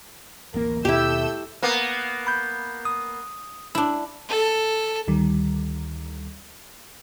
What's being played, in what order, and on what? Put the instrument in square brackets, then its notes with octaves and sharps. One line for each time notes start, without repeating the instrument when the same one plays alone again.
[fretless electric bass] D1 A1 A#3 [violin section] A#4
[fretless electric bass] D#2 B2 [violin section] A3 E6 G6 [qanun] E4 G4
[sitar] A#3 B3
[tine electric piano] B5 G6
D#6
[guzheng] D4 E4
[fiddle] A4
[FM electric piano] D2 D#3 G3